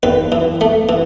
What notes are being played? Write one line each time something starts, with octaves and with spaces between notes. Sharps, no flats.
D#2 B4
E3
A3
E3